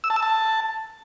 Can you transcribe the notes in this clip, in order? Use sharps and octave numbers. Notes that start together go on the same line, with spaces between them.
E6
A5
E6
A5